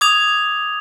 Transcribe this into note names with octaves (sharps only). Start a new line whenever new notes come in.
D6 D#6 G#6 F7